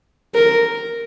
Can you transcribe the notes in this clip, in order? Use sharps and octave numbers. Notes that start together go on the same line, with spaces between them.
A#4